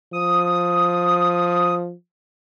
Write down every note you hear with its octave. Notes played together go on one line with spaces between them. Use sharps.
F3 D#6